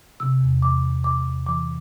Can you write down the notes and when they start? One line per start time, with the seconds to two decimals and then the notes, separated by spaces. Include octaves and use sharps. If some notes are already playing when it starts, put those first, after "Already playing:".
0.20 C3 E6
0.41 E2
0.62 E3 D6
0.84 E2
1.04 C3 D6
1.26 E2
1.46 E3 D6